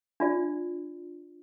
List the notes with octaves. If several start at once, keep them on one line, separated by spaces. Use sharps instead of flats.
D4 F4 D5